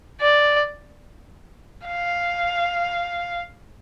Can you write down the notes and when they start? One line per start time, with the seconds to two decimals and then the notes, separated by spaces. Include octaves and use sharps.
0.21 D5
1.88 F5